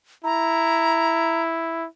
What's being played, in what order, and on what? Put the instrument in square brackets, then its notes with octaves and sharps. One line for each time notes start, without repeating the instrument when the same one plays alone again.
[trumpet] E4 [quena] A#5